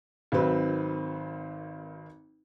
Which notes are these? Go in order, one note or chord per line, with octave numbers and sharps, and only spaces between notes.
G#1 D#3 F#3 C4 B4